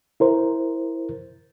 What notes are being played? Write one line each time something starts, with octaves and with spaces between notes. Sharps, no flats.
E4 A#4 C5